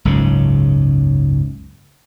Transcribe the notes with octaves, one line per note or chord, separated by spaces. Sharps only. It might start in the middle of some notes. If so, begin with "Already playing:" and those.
F#1 C#2 G#2 C#3